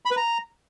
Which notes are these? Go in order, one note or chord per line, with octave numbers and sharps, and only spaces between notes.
B5
B4
A#5